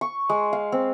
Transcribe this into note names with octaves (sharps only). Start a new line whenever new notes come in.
C#6
G#3
F5
C4